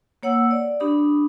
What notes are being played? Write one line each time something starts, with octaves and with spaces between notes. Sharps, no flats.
A#3 C#5 F#5 E6
D5
D4 G4 B5 D#6